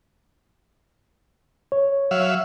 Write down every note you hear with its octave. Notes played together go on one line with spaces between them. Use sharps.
C#5
F#3 E5 F5